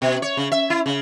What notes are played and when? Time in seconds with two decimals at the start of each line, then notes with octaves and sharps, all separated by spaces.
0.02 B2
0.22 C#5
0.37 C#3
0.52 E5
0.70 E4
0.86 C#3